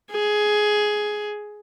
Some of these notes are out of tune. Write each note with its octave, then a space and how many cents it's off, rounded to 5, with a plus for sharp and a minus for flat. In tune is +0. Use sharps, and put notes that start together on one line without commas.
G#4 +10